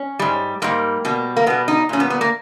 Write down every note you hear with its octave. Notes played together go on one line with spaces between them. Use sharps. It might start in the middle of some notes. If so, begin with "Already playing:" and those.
Already playing: C#4
G#2 G3
G#2 G3 A#3
B2 G3
A#3
B2 G3 B3
D#4
A#2 G3 C#4
B3
B3
A#3